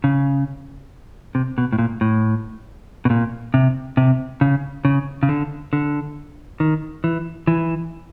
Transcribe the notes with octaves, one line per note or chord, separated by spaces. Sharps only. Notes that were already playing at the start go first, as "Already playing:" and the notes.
C#3
C3
B2
A2
A#2
A2
B2
A#2
C3
C3
C#3
C#3
C#3
D3
D3
D#3
E3
E3